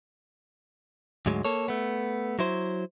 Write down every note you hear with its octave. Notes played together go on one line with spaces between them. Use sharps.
D2 G#2 F#3 G#3
A#3 A4 C#5
A3 B3
F#3 E4 C5